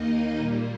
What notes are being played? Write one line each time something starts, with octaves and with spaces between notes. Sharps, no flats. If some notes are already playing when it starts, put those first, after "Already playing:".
Already playing: D#2 D#3 A#3 D#4 D#5
A#2 G3 A#3